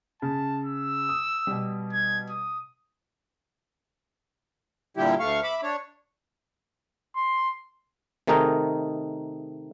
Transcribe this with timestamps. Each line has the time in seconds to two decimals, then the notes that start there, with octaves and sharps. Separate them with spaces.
0.22 C#3 A5
0.65 E6
1.09 D#6
1.47 B2 G3
1.93 G#6
2.30 D#6
4.97 A#2 D3 G3 E4 G4
5.20 D2 A3 F5 C#6
5.44 E5 B5 D6
5.63 D4 C#5
7.16 C6
8.27 C3 D#3 A3 D#4 G#4 A#4